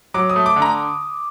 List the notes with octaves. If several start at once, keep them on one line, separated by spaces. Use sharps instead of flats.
F#3 D6
D#6
A3
D6
D3
A#5